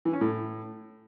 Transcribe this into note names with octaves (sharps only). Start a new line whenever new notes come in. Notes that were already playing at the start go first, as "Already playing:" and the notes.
E3
C#4
A2